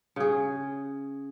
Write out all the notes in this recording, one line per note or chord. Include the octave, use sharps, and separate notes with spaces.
C#3 G#4